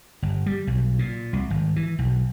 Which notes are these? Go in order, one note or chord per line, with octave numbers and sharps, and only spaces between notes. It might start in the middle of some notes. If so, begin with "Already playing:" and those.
G1
G3
B1
A#2
C2
G#1
E3
B1